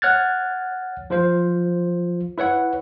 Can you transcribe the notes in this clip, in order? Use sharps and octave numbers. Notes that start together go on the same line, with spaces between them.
C#5 F#5 F6 F#6 G#6 A6
F3 F4 C5
E4 B4 C#5 F#5